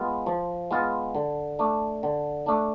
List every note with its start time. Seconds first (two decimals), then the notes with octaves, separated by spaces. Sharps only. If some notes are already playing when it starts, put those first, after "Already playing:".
Already playing: G#3 B3 F4
0.26 F3
0.71 G#3 B3 F4
1.15 D3
1.59 A3 D4
2.03 D3
2.46 A3 D4